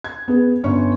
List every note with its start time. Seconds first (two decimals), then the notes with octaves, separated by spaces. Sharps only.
0.04 G#6
0.28 B3 G#4
0.63 G1 C#4 C#6